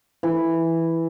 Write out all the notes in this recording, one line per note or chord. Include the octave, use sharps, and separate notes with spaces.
E3